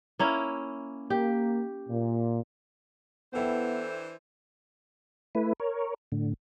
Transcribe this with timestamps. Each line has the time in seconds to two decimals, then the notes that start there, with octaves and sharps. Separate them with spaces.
0.19 A#3 C#4 E4
1.10 A#3 G4
1.89 A#2
3.33 E3 B3 D4 E4 A4 C5 G5
5.35 A3 E4 B4
5.60 A#4 C#5
6.12 A2 D3